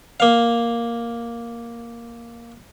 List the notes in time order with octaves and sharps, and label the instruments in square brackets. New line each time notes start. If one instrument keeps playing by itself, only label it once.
[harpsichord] A#3 F5